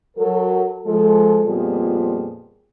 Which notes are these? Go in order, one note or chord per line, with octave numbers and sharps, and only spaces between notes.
F#3 A4 A#4
F3 G#3 A4
F2 A#2 F3 G3 B3 G#4